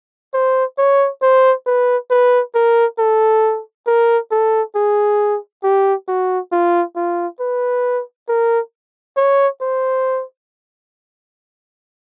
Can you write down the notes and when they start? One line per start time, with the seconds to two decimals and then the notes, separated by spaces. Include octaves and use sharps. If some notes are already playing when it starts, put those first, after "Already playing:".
0.34 C5
0.78 C#5
1.22 C5
1.66 B4
2.10 B4
2.55 A#4
2.99 A4
3.87 A#4
4.31 A4
4.76 G#4
5.64 G4
6.08 F#4
6.52 F4
6.96 F4
7.40 B4
8.29 A#4
9.17 C#5
9.61 C5